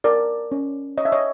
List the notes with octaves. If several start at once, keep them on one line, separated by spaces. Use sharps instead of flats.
A#4 D5
C#4
C#5 D#5
E5
C#5 D#5